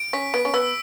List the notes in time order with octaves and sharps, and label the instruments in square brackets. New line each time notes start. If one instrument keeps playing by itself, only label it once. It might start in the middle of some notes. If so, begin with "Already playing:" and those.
Already playing: [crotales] D7
[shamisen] C#4 [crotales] B6
[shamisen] B3 [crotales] D7
[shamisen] C#4
[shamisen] B3 [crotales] E6